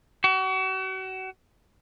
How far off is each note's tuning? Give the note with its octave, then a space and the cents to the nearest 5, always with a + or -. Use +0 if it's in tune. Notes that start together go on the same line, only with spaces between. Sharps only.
F#4 +35